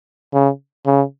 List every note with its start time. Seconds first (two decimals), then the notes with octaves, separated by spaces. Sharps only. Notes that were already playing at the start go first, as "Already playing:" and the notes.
0.33 C#3
0.86 C#3